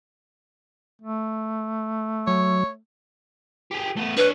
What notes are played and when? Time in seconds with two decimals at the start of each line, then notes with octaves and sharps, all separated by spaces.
1.02 A3
2.27 F#3 C#5
3.71 G4 G#4
3.97 A3 B3
4.17 D4 B4 C#5